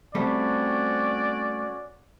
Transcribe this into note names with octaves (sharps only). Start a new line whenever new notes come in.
G3 A3 C4 C#4 F#4 D5